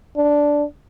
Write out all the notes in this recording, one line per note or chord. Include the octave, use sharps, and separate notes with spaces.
D4